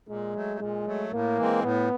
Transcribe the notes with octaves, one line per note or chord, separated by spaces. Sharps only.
A#2 G#3
F#3 A3
A#2 G#3
F#3 A3
A2 A#3
E3 G#3 C4
A2 B3